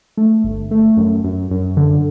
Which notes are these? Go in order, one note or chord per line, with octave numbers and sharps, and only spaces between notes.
A3
G1
A3
F#2
F#2
F#2
D3